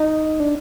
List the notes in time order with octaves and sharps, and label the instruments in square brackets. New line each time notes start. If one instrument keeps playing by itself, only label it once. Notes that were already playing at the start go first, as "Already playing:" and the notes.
Already playing: [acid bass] D#4
D4